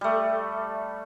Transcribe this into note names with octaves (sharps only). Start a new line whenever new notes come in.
G3 A3